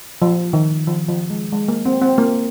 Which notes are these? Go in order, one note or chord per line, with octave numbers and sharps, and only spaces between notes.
F3
D#3
F3
F3
G#3
G#3
A#3
C4
C4
A#3